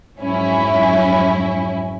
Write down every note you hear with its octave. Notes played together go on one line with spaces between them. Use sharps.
F2 G#2 F#3 C#4 E4